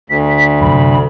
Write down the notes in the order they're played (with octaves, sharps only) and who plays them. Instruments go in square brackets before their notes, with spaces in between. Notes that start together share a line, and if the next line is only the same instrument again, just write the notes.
[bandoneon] D2 [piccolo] B6
[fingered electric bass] C2 F#2 [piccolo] B5